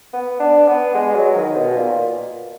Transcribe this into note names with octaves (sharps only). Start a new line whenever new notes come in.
B3
D4
B3
G#3
F#3
D#3
B2
A#2